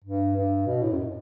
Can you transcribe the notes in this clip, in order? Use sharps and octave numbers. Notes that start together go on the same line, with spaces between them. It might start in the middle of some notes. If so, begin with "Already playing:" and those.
G2
G2
B2
A2
F#2